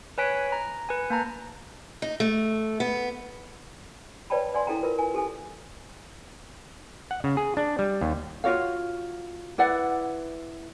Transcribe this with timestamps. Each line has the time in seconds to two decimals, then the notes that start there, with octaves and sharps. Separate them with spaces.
0.18 B4 C#5 G#5 F#6 B6 D7
0.52 A#5
0.89 B4 G#5
1.10 A#3 A5 A#5
2.02 D#4
2.20 A3
2.80 B3
4.30 B4 C#5 D5 G5 A5 B5
4.54 D5 F#5 G#5 C6
4.67 E4 A4 F5 G5 A#5
4.83 F4 A#4 B4
4.99 G#5
5.14 G4 A4 G#5
7.11 F#5
7.24 C#3
7.37 G#4
7.57 D4
7.79 G3
8.01 D#2
8.44 F4 F#4 C#5 F5
9.58 E4 B4 D5 F#5